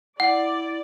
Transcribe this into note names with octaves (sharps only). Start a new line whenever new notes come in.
E4 D5 F#5